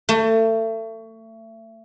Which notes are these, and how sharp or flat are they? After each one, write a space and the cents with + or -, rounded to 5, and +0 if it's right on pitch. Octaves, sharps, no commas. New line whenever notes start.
A3 +30